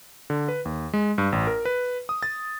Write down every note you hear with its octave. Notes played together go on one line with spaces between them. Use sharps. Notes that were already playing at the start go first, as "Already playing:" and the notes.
D3
B4
D#2
G#3
G2
A1
A#4
B4
D#6
A6